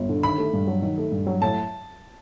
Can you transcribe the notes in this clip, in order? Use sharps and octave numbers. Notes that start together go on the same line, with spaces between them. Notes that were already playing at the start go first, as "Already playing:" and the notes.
Already playing: G1
D3
D#3 B5
A3
G2
F#3
D#3
A3
G2
F#3
A2 A5